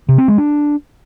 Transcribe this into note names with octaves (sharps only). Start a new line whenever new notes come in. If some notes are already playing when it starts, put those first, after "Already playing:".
C3
C4
G#3
D4